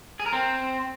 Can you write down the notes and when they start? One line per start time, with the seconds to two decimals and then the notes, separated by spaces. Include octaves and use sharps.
0.20 G#4
0.26 A#4
0.33 C4